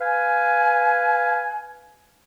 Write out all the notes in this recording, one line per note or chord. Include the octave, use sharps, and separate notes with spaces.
B4 F5 G#5